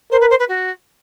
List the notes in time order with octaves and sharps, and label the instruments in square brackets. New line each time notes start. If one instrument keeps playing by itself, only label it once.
[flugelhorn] A#4 [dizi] C5
[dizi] B4
C5
B4
F#4